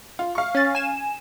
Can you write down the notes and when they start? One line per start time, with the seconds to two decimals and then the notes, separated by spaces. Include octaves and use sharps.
0.19 F4
0.35 F5 C#6
0.55 C#4 A6
0.75 G#5 E7